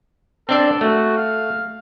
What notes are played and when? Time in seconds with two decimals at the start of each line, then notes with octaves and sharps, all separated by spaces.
0.49 C4 D4 A4 D5
0.81 A3 F#4
1.16 F5